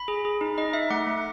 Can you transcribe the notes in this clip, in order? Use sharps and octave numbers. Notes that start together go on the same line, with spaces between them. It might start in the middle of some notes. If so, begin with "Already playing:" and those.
Already playing: B5
G#4
G#4
D#4
D#4 D#5
D#4 E5
A3 F#5
A3